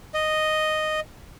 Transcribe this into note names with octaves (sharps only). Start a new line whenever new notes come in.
D#5